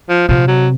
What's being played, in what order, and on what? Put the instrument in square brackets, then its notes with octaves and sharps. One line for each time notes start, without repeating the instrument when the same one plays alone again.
[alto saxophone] F3
[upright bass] C3 [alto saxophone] F3
[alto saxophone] F#3